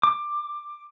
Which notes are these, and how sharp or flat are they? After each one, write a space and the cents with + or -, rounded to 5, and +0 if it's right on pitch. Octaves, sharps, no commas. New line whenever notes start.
D6 +15